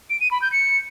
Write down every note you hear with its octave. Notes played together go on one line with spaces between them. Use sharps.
D7
D#7
B5
G6
C#7